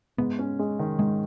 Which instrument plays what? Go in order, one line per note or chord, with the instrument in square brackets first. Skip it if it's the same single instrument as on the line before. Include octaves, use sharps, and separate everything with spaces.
[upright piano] G#2 [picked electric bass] B3
[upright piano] C#4
G#3
D#3
[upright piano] G#2 [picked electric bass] G#3